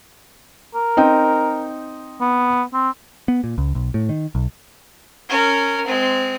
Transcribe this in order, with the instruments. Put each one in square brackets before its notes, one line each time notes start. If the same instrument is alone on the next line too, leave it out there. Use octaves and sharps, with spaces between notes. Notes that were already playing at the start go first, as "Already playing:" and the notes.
[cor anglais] A#4
[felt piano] C4 D#4 G5
[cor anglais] B3
C4
[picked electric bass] B3
A#2
C#2
B1
A2
D#3
B1
[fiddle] C#4 A#4
G#3 C4